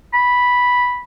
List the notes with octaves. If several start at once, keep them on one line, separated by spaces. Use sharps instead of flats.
B5